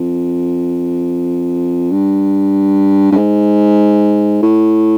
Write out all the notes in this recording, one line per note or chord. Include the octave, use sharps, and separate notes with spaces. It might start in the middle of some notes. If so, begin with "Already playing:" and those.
Already playing: F2
G2
G2
G#2
A2